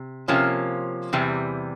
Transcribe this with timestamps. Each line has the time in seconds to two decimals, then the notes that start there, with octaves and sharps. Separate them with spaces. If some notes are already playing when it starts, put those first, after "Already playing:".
Already playing: C3
0.28 C3 F3 A#3 C#4
1.13 E2 C3 E3 G3